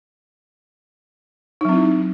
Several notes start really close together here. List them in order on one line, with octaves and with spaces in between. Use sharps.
D#4 F#3 C4 E4